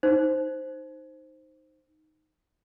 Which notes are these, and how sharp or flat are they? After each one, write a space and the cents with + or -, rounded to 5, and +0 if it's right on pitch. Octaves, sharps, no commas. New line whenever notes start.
D#4 +0 C5 +0